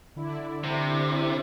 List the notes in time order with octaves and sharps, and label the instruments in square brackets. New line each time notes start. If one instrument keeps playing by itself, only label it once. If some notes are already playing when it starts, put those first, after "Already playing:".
[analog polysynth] D3 E4 D5
[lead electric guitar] C3